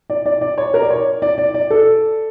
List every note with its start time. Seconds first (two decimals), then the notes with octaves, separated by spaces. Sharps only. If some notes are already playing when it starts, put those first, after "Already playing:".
0.10 D5
0.26 D5
0.41 D5
0.58 C#5
0.74 A#4
0.83 D5
0.90 C#5
1.22 D5
1.38 D5
1.54 D5
1.70 A4